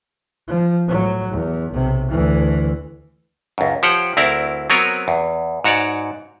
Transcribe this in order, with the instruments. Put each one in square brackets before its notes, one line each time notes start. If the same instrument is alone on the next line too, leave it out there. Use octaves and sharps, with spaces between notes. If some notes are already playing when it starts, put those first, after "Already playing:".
[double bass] F3
A2 F#3
E2
B1 C3
D2 E3
[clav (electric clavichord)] C#2 F#2
F3 G4 C5 C#5 F#5 G5
D2 C4 E4 A#4 D5
F#3 B3 C4 A#4 B4 C#5
E2
G#2 F#4 C#5 D5